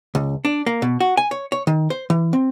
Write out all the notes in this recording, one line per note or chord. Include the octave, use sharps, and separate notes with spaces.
C#2
D4
A#3
B2
F#4
G#5
C#5
C#5
D#3
C5
E3
C4